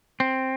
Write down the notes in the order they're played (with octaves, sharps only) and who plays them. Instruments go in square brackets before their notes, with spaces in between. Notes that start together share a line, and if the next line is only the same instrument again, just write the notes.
[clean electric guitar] C4